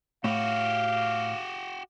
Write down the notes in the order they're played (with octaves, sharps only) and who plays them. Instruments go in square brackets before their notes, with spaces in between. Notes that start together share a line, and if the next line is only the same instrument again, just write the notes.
[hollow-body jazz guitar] A2 [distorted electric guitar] F#4 G4 [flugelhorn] F5